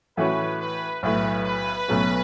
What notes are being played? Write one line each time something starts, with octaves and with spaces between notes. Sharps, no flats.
A2 E3 A3 C#4 F#4 B4
B4
B1 A2 A3 B4
B4
B1 B2 F#3 A3 C#4